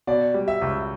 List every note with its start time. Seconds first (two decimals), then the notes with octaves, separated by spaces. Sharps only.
0.07 B2 D5
0.34 G3
0.48 E5
0.61 C#2